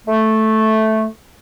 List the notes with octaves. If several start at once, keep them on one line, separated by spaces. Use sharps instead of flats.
A3